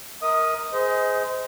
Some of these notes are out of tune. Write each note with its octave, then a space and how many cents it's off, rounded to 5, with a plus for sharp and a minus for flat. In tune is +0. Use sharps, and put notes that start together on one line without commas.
A#4 +0 D#5 +40 D#6 +0
G#4 +0 C5 -25 D#5 +20